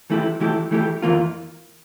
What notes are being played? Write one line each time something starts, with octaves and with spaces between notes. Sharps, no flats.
E3 A3 E4 G4
E3 A3 E4 G4
E3 A3 E4 G4
F2 E3 A#3 F4